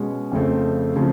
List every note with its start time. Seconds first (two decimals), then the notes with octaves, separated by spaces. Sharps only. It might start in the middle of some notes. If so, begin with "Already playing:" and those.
Already playing: B2 G#3 C#4
0.32 F2 C#3 F3 A3 C4
0.95 C#3 F3 A3 C4